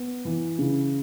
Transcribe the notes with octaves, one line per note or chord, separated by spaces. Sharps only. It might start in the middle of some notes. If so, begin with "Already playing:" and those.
Already playing: B3
E3
C#3